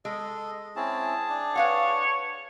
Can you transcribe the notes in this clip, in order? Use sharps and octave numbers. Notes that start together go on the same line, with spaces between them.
G#3 A4 D#5
C4 C#4 E4 G#4 A5
D4
B4 C#5 F5 F#5